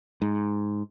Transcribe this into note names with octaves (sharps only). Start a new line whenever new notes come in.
G#2